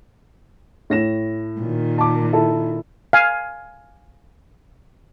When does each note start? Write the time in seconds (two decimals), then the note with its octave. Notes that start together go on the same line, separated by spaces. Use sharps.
0.90 A2 A#6 E7
1.60 A#2 D#3
1.98 A5 D6
2.33 E4 A4 A5
3.13 F5 G#5